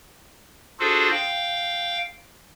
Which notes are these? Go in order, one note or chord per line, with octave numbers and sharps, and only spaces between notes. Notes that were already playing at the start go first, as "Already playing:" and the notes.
D4 F4 F#4 G#4 A4 C5
F5 G5